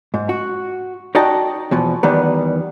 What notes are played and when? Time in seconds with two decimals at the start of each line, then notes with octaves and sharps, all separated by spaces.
0.14 G#2
0.29 F#4
1.15 D#4 F#4 D5 D#5 G5 A5
1.71 E2 B2 F3
2.03 E2 D#3 G3 B3